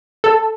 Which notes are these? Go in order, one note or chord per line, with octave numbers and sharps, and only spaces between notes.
A4